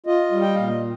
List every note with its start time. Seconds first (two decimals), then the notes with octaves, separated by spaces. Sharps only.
0.06 F4 D#5
0.32 G3
0.41 G5
0.55 A#2 F5
0.68 D#5